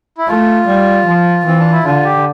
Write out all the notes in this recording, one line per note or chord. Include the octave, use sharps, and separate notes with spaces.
E4
A3 F4
G3
F3
E3 C4
D4
E4
D3 F4
G4